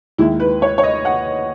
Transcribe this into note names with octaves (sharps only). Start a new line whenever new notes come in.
D#2 D#3 G#3 E4
B4
C#5
C#5
D#5
F#5